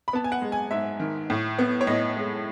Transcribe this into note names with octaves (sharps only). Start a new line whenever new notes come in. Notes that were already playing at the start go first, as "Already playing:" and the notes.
B5
B3 A5
G#5
F#5
G#3
G#5
G#2 E5
D#3
A2
B3
C#5
A2 D#5
G#3